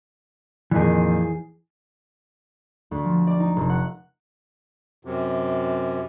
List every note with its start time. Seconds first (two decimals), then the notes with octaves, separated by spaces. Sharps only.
0.71 F2 A#2 D#3 E3 G#4
2.91 D2
3.05 F3
3.27 D5
3.40 D#4
3.56 F1
3.70 F#5
5.05 F#2 C3